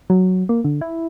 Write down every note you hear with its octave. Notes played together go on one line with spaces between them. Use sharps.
F#3
A#3
D3
E4